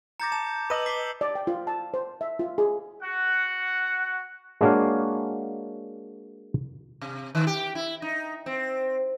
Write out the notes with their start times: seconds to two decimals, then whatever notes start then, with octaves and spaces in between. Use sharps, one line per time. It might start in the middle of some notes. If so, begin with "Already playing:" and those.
0.20 A#5 D6 G6 A6 A#6 C#7
0.32 A5 E7
0.70 B4 D#5 E6 G6 D#7 F#7
0.86 D6 B6 C7 G7
1.21 D5
1.35 G5
1.47 F4
1.67 A5
1.94 C5
2.21 E5
2.39 F4
2.58 G#4
3.02 F#4 F#5
4.61 G#3 A#3 D4 F#4 C#5 F5
7.01 C3
7.35 D#3
7.47 G4
7.75 E4
8.02 D#4
8.46 C4